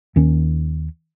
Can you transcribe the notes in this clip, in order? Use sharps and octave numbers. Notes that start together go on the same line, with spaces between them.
D#2 D#3 C#4